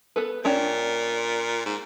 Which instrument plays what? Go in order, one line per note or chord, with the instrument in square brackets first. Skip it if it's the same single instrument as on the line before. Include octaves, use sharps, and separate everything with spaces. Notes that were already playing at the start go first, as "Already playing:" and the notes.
[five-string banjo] B3 A4 B4
[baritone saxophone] A#2 [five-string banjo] C#4 D4 G5
[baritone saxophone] G#2